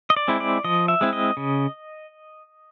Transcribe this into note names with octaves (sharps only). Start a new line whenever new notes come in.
D#5
D5
G#3 C4 E4
D5
F3 D#5
E5
G#3 C4 E4
D#5
C#3